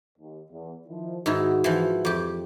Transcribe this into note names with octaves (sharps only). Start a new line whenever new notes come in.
D#2
E2
D#3 F3 E4
G#2 D#3 E4 F#4
E3 F3
F2 G4